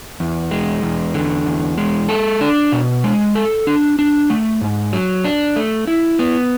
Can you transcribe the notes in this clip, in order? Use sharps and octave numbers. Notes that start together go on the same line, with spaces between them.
E2
G#3
E2
D3
E2
G#3
A4
D4
B2
G#3
A4
D4
D4
A3
G#2
F#3
D4
A3
E4
B3